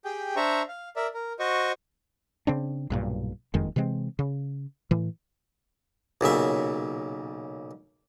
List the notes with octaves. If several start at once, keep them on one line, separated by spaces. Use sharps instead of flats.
G4 G#4 G5
D4 C5 E5 A#5 C#6
F5
A#4 D5 E5
A#4
F#4 C5 D#5 C#6
C#3 C4 D4
B1 G2 A#2
F#1 F2 D#3 G#3
C3 E3 G#3 C4
C#3
A2 E3
B1 A#2 C#3 E5